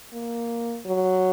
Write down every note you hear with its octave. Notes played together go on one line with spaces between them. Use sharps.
A#3
F#3